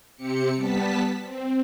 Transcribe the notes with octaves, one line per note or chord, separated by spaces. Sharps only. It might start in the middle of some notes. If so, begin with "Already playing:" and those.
C3 C4 G4 C#7
G3 B3 A5 B6
C4